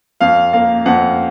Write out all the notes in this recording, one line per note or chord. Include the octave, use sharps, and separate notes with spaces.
F2 F5
A#3 F5
F2 F#5